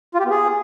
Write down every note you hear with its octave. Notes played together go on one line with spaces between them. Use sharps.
F4
G4
B3
G#4